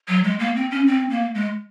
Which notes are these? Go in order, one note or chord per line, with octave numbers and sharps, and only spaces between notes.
F#3
G#3
A#3
C4
C#4
C4
A#3
G#3